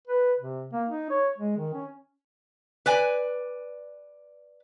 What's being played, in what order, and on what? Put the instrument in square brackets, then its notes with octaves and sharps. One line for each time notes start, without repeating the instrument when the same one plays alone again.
[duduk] B4
C3
A#3
D#4
C#5
G#3
D#3
C#4
[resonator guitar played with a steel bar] B4 D5 G#5